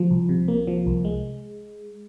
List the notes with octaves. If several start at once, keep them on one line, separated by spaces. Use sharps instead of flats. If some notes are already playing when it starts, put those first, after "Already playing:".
Already playing: F3
C2
C3
A#3
F3
C2
G#3